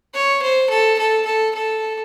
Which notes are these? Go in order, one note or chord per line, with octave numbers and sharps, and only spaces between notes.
C#5
C5
A4
A4
A4
A4